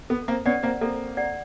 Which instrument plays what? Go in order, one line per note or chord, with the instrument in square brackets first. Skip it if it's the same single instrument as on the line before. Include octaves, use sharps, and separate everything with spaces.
[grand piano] B3 [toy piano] A4
[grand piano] A#3 C4
[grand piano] B3 C#4 [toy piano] D5 F#5
[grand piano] A#3 C4
[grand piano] A#3 C4 [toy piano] A4
[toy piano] D5 F#5